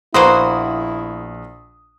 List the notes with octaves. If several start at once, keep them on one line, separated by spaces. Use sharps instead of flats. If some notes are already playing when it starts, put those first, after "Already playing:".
A#1 A#3 B3 E4 F#4 C5 D#6